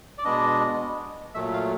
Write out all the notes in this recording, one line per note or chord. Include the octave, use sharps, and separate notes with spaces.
D5
B2 G#3 B3 D4 D#5
A#2 F#3 A3 E5
F5